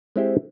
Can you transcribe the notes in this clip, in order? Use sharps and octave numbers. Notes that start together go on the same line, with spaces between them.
G#3 C4 E4 G4 C5